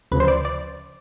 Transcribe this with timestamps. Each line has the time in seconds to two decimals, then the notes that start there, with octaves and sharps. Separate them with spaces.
0.11 D2 C#3 F3 B4
0.20 C5
0.28 D5
0.45 D5